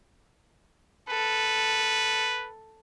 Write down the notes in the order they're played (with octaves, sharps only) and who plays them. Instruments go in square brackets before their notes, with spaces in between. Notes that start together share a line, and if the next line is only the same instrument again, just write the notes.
[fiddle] A4 [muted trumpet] B4